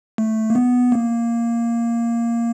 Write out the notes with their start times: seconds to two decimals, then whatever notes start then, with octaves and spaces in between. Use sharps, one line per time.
0.18 A3
0.50 A#3
0.55 B3
0.92 A#3